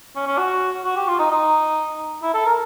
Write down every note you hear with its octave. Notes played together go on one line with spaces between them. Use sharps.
C#4
C#4
F#4
F#4
G4
F4
D#4
D#4
E4
A4
A#4